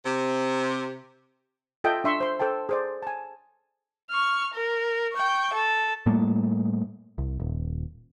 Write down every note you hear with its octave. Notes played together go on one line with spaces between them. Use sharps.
C3
F4 A4 D#5 E5 G5
D4 E5 C6 C#6
C5 C6
A4 C5 G5 A5
G#4 C5 D5
G#5 A5
C#6 F6
A#4
G5 C#6
A4
A2 G3 A3 A#3
C2
D#1